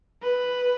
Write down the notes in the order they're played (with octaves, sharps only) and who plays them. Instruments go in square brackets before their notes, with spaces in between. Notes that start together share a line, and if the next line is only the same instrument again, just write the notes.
[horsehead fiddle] B4